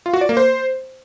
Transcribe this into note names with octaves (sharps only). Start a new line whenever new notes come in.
F4
F#4
D5
A#3
C5